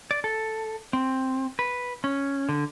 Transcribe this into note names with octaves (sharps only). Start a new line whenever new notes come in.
D5
A4
C4
B4
C#4
D3